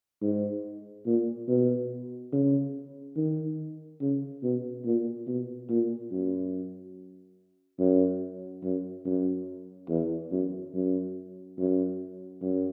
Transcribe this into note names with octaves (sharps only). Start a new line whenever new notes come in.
G#2
A#2
B2
C#3
D#3
C#3
B2
A#2
B2
A#2
F#2
F#2
F#2
F#2
E2
F#2
F#2
F#2
F#2